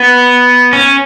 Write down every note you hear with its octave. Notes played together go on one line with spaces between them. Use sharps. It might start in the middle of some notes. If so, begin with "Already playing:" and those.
Already playing: B3
C#4